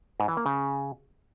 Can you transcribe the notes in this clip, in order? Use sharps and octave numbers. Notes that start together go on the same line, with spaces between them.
G#2
E3
A#3
C#3